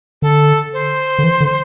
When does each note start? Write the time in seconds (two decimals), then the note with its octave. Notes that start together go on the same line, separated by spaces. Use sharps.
0.22 D3 A4
0.73 C5
1.19 D3
1.24 E3
1.40 D3